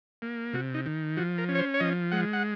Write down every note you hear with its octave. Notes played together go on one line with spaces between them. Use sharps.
A#3
C3 F#4
D#4
D#3
F3 F#4
A#4
C#4
C#5
C5
C#5
F3 D#5
G#3 F#5
F#5